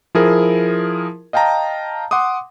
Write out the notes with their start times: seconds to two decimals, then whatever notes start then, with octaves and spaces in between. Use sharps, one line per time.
0.15 F3 E4 G#4 A#4
1.33 D#5 F5 G5 A5 A#5
2.11 F#5 C6 D6 D#6